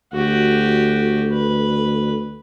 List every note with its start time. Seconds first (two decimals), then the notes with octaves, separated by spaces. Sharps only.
0.13 D2 F#4 G4
1.33 B4